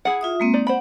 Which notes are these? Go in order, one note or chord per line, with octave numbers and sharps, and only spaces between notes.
E4 G#4 F#5
F4 E5 D#6
G#3 A#3 C4
D#4 D5
C5 D5 F#5 B5